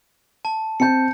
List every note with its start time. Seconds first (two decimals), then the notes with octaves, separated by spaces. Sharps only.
0.45 A5
0.80 C4 A5 G6 C#7